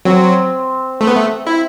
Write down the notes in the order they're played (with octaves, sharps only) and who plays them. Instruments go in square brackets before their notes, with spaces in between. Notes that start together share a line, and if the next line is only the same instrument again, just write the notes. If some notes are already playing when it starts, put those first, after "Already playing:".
[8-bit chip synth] F#3 [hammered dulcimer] C4
[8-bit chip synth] A3
B3
A3
E4